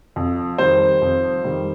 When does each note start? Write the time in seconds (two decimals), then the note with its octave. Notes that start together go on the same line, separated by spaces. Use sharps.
0.16 F2
0.58 D#3 G3 C5
1.02 F2
1.44 D#3 G3